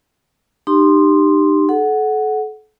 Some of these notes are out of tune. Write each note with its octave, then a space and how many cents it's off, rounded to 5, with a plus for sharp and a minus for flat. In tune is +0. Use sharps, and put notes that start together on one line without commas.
D#4 -35 G4 +0 C6 +0
A4 -35 F#5 +0